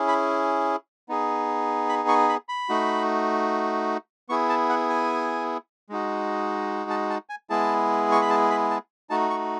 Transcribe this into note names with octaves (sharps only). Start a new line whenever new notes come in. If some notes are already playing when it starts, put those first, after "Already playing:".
Already playing: C#4 E4 G#4
B5
B3 D#4 G#4
B5
C#6
B5
B5
A3 D#4 F#4
B3 E4 G#4 C#6
A5
F#5
G#5
G#3 D#4 F#4
A5
A5
G#5
G#3 B3 E4 G#4 A5
C#6
B5
A5
B5
A5
A3 D#4 F#4 A5
C#6